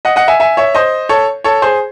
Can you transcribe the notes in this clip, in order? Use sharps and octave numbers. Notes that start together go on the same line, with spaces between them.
D#5 F#5
D#5 F#5
E5 G#5
E5 G#5
C#5 E5
C5 D#5
A4 C#5
A4 C#5
G#4 C5